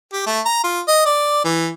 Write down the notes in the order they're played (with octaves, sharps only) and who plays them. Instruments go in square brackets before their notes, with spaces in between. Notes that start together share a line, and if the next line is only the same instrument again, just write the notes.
[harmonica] G4
A3
A#5
F4
D#5
D5
E3